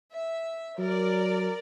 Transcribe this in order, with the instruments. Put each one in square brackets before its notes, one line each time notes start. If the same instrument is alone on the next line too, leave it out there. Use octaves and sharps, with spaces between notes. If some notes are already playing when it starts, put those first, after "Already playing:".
[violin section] E5
[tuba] F#3 [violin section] A#4 D5